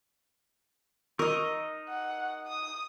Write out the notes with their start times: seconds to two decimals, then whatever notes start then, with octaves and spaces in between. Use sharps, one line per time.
1.19 D#4 A#4 D#5 C#6 E6
1.89 F#5
2.47 D#6